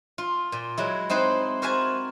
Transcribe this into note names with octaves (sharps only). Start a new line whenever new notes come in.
F4
A#2
F#3 G#3 E4
C4 D#4 E4 C5 F#5
F#4 A#4 C5 E5 G#5 A5